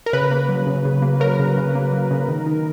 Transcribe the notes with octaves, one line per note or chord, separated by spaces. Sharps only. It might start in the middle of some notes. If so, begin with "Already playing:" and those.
A#4
C#3 B4
A#3
F#3
C#3
C#3
A#3
F#3 A#4
C#3
C#3
A#3
F#3
C#3
D#3
D#3